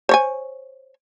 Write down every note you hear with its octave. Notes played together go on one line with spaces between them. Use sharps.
C5 C#5 G#5